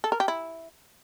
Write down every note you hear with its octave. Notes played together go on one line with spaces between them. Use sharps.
A4
A#4
G4
E4